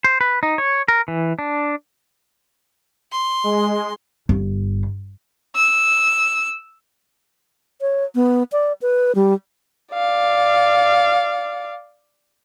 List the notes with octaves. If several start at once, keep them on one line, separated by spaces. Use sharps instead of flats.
C5
B4
D#4
C#5
A#4
E3
D4
C6
G#3
G1
E6
C#5
B3
D5
B4
G3
D5 F5